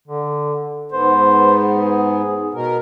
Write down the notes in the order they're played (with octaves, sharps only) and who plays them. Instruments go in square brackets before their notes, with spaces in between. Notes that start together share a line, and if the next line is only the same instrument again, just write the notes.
[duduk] D3
[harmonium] G#2 B3 [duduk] C5
[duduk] G#4
[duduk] B2 [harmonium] A#4